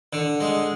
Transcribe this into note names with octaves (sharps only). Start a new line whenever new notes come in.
D3
G#3